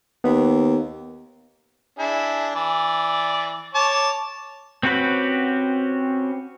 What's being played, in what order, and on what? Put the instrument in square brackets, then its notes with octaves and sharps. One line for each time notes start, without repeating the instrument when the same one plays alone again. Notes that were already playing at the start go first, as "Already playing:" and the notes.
[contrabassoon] D#2 [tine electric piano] B3
[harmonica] D4 E4 G#4
E3 D5
C#5 A5 D6
[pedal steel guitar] C4 C#4 F#4 G4 B4